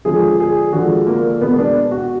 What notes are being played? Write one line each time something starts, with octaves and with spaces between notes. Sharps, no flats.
D3 F3 G#3 G#4
G#4
D3 F3 G#3 F#4
A#3
B2 G#3 B3
D4
F#4